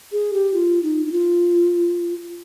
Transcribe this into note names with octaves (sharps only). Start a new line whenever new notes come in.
G#4
G4
F4
D#4
D#4
F4